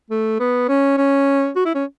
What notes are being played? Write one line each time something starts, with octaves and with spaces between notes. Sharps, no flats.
A3
B3
C#4
C#4
F#4
E4
C#4